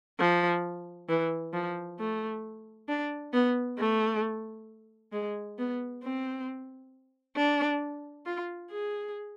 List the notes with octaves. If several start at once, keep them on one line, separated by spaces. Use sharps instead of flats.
F3
E3
F3
A3
D4
B3
A3
G#3
B3
C4
D4
F4
G#4